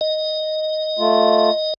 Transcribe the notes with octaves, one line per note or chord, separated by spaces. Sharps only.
D#5
A3 F4